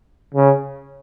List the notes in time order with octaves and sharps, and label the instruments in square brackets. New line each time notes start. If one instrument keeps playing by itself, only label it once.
[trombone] C#3